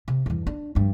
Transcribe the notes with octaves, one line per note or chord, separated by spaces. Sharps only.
C3
E2 G2
D4
G2 F3